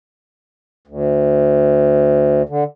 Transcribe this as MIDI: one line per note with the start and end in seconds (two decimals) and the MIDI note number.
0.87 2.42 38
2.49 2.64 50